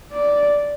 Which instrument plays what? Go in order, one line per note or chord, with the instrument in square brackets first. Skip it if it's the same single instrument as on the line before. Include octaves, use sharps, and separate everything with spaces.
[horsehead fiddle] D5